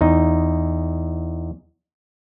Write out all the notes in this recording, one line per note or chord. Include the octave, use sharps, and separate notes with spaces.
E2 D#4